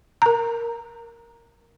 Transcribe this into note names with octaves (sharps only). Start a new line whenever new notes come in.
A#4 A#5